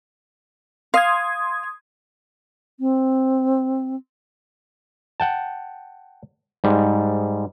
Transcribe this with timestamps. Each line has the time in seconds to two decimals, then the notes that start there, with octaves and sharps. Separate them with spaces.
0.94 F5 C6 D#6 G#6
2.79 C4
5.20 F#5 G5 A5
6.64 G#2 G3